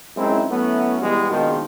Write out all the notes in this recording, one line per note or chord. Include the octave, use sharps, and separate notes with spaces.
F#2 G#3 C4 D#4 E4
F#3 A3 B3 C#4 E4 F#4
B2 E3 G3 G#3 B3
A#1 B2 D#3 F3 G#3